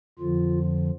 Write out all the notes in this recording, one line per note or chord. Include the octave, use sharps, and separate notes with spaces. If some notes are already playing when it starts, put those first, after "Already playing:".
F2 D3 F3 F4